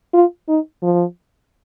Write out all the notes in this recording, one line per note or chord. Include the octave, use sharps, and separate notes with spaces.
F4
D#4
F3